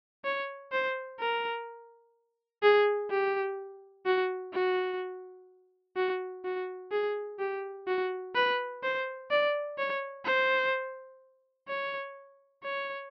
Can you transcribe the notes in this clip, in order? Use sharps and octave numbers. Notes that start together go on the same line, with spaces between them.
C#5
C5
A#4
G#4
G4
F#4
F#4
F#4
F#4
G#4
G4
F#4
B4
C5
D5
C#5
C5
C#5
C#5